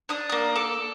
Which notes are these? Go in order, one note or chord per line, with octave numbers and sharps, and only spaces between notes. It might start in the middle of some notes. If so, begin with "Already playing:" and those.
D4 D#6
A#3 D#6
A4 D6